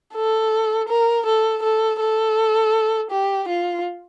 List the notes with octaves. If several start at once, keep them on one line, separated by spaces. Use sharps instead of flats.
A4
A#4
A4
A4
A4
G4
F4